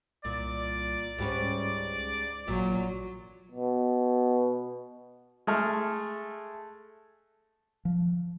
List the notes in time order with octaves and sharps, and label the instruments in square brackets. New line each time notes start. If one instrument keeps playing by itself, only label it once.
[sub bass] C2 [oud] A#2 [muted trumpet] D5
[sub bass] C#2 [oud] G#2 G3 C#4
[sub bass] A1 [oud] A#2 [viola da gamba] F#3
[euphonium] B2
[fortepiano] G#3 A3 F6
[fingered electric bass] F3